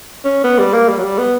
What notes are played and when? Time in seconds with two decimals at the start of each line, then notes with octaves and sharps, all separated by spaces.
0.25 C#4
0.44 B3
0.59 G3
0.73 A#3
0.89 G3
0.98 F#3
1.03 G3
1.18 B3